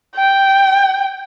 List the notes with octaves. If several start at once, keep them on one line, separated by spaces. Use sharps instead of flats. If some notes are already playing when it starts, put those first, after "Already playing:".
G5